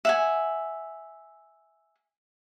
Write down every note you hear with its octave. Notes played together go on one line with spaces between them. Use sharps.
E5 F#5 G#5